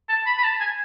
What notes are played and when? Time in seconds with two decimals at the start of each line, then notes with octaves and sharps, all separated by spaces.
0.09 A5
0.27 B5
0.38 B5
0.44 A5
0.61 G#5